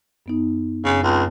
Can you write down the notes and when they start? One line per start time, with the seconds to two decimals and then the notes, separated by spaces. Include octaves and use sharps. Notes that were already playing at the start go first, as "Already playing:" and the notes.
0.26 F#2 B3 D#4
0.85 F#2 C#3 C4
1.03 C#2 C#5 A5